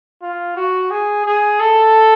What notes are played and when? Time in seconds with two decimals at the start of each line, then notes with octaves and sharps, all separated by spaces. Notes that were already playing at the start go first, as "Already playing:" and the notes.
0.22 F4
0.57 F#4
0.91 G#4
1.26 G#4
1.60 A4